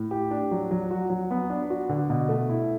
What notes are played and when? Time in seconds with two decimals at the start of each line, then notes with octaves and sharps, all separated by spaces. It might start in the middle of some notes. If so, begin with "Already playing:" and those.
Already playing: A2
0.11 G4
0.31 D4
0.51 F#3
0.71 F#3
0.91 F#4
1.10 F#3
1.31 B3
1.50 D4
1.70 F#4
1.89 D3
2.10 B2
2.29 A3
2.49 E4